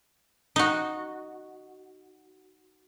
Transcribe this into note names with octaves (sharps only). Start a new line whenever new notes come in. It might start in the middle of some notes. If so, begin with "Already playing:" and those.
D#4 F#4